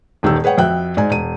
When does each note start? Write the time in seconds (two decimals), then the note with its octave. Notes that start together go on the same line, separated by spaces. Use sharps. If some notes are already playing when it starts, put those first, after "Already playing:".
0.23 D#1 D#3 G3 E6
0.44 G#4 B4 C#5 F#5 G5
0.58 F2 F#4 E5 G5 F#6
0.97 G#2 D5 G#5
1.10 E1 D#7